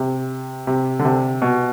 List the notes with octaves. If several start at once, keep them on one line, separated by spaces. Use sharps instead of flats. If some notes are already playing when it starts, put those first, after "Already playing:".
Already playing: C3
C3
D3
C3
B2